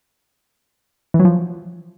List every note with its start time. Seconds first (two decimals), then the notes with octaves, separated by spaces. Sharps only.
1.14 E3
1.20 F#3
1.25 F3